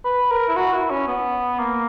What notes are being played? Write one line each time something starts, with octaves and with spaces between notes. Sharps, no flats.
B4
A#4
E4
F#4
E4
C#4
B3
A#3